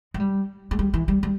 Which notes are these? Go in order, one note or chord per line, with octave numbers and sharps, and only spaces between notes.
G#3
G3
G#3
G3
E3
G3
G3